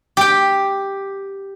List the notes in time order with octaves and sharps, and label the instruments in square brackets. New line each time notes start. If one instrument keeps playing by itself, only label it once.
[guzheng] G4 G5